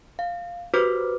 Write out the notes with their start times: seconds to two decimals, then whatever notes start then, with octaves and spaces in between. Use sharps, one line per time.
0.19 F5
0.74 F#4 G4 B4 C5 D6 F6